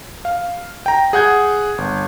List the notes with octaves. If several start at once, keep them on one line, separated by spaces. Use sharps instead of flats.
F5
G5 A#5
G#4 F#5 G6 G#6
G1